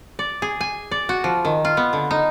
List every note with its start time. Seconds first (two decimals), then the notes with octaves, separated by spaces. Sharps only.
0.19 D5
0.42 G#4
0.61 G#5
0.91 D5
1.09 F#4
1.24 F3
1.45 D#3
1.65 F4
1.77 B3
1.93 D3
2.11 D#4